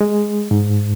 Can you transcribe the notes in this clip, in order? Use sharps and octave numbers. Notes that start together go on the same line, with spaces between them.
G#3
G#2